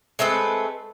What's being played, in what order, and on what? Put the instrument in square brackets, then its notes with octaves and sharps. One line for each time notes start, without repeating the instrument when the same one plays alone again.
[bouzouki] G#3 A3 C4 B4